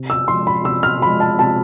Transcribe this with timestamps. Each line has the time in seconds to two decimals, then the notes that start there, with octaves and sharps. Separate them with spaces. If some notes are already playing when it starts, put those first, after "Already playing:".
Already playing: C3
0.10 E6
0.28 F3 G#3 C6
0.47 B5
0.65 C3 E6
0.83 F6
1.02 F3 B5
1.06 G#3
1.20 A5
1.39 C3 A5